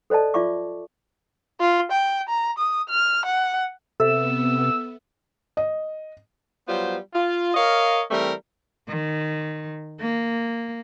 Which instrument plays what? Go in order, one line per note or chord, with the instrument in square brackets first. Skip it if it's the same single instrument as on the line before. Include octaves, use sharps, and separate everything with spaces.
[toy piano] A4 C5 D5 D#5 A5
F4 D5 E5 C#6 D6
[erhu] F4
G5
A#5
D#6
F6
F#5
[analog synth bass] C3 [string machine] B3 [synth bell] A4 E5 [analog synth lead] E6
[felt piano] D#5
[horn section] F#3 G3 B3 F4 C5
F4
A#4 C#5 D#5 F5
E3 G3 A3 C4 A#4
[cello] D#3
A#3